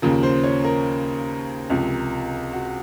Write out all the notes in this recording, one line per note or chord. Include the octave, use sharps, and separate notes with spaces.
D#2 C#3 F3 A#4
C5
C#5
A#4
C#2 C3 F3
F#4